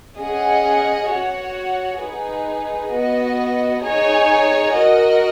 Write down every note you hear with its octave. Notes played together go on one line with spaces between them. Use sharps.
C#4 G#4 D#5 F#5
F#4 C#5 F#5
D#4 G#4 B4
B3 F#4 B4 D#5
D#4 G#4 C#5 G#5
F#4 A#4 D#5